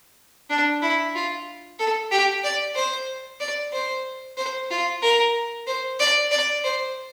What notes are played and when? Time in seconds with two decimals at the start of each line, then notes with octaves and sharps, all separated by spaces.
0.50 D4
0.82 E4
1.15 F4
1.79 A4
2.11 G4
2.44 D5
2.76 C5
3.40 D5
3.73 C5
4.37 C5
4.71 F4
5.02 A#4
5.67 C5
5.99 D5
6.31 D5
6.64 C5